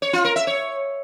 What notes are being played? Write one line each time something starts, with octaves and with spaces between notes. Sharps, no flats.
C#5
F4
A#4
E5
C#5